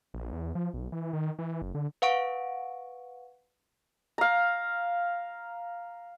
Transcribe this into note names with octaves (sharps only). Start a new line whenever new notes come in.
A#1
E2
F3
B1
E3
D#3
E3
F#1
D3
B4 F5 F#5 C#6 D7
F5 A#5